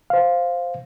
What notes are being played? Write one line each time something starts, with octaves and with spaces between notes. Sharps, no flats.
C5 F5